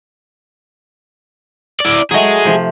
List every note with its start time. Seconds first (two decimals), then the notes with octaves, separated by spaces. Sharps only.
1.80 E4 D5
2.11 F#3 A3 G#4 D#5
2.45 C3 F3